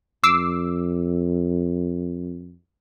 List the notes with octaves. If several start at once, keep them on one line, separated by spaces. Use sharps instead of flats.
F2 D6 E6 C7